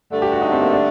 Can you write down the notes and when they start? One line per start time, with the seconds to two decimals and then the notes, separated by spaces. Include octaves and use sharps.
0.11 G2 D3 A3
0.22 G4
0.32 F#4
0.41 D#4
0.52 C4
0.62 A#3
0.73 D4